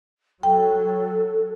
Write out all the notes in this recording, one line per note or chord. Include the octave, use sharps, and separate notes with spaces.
F#3 A4 G5